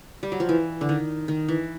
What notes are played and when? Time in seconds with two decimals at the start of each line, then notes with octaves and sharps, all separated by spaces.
0.23 G3
0.32 F#3
0.40 F3
0.49 E3
0.81 D3
0.89 D#3
1.28 D#3
1.48 E3